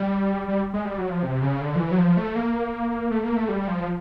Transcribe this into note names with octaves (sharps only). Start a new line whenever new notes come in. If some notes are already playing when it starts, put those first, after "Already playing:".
Already playing: G3
G3
G#3
G3
F#3
F3
C3
C#3
D3
F3
E3
F#3
F3
A3
A#3
A3
A#3
A3
G3
F3